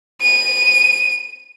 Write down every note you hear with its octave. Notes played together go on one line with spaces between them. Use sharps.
D#7